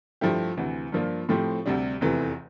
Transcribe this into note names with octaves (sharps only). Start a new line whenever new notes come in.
G2 F3 A3 E4 G4
D2 C3 E3
G2 F3 A#3 D4 F4
A2 F3 A3 C4 G4
D2 C3 G3 D4
F1 E2 C3 E3 A3